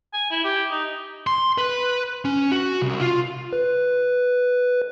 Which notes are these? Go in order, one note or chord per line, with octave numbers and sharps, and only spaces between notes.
G#5
E4
G4
D#4
C6
B4
C#4
F#4
C2
F4
B4